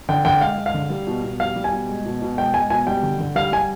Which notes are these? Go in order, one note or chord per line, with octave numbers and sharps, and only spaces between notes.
D3 G5
D3 G5
G#3 F5
G#3
F5
D3
G3
B2
B2
G3 F5
G3
G#5
B2
G#3
B2
B2
G#3 G5
G#3 G#5
B2 G#5
G3 G5
D3
D3
G3 F5
G3 G#5